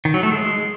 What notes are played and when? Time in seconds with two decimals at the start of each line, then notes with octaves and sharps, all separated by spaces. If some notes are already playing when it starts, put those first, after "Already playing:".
0.05 D#3
0.14 F#3
0.23 A3
0.32 G#3